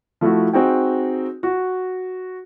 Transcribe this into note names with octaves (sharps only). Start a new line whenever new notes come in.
F3 A3 E4 F#4
C4 D#4 F#4 G#4 G5
F#4